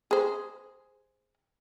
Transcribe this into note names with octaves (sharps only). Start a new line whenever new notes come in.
G#4 C5